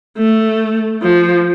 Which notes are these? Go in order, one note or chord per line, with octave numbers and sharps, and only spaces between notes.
A3
F3